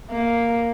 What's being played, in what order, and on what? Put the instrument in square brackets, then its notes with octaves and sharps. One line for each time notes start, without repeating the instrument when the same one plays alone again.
[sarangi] A#3